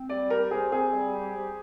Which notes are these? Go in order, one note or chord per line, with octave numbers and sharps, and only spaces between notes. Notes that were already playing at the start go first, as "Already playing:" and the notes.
Already playing: C4
G3 D5
G4 A#4
G#4 C5
C4 G#4
G3
G4
C5